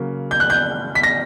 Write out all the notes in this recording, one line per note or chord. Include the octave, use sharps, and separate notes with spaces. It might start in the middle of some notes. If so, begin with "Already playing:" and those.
Already playing: C#3 F#3 A#3
G6
F#6
G6
B6
A#6